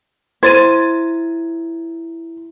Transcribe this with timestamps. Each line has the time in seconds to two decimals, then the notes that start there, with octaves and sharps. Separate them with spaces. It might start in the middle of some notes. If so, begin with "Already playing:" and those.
0.43 E4 C5 G#6 A6 D#7